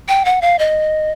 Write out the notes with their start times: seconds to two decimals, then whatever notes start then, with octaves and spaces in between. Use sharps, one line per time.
0.08 G5
0.25 F#5
0.42 F5
0.59 D#5